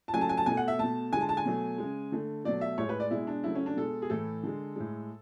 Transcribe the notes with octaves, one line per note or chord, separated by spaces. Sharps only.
A5
C#3 F#3 A3 G#5
A5
G#5
A5
B2 A3 G#5
F#5
E5
B2 A3 A5
D3 G#3 G#5 A5
A5
G#5
B2 F#3 A3
C#3 G#3
D3 A3
B2 F#3 A3 D5
E5
A2 G#3 C#5
B4
D5
B2 G#3 E4
D4
C#3 F#3 A3 E4
C#4
D4
B2 G#3 A4
G#4
A2 E3 A3 A4
D3 G#3
A2 G#3